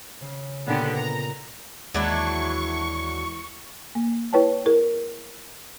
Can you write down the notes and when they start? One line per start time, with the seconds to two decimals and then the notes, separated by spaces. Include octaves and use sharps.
0.21 C#3 C#4
0.67 A#2 D3 B3 G4
0.96 A#5
1.94 D#2 E3 F#3 G#3 D4 E4 C#6
3.95 A#3
4.33 E4 B4 C#5 G5 A5
4.66 E4 G#4 A#4